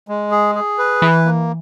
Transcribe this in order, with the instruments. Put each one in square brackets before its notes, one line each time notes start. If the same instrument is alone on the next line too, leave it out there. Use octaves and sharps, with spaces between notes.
[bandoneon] G#3
G#4
G#4
B4
[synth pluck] E3 [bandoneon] E4
[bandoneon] A#3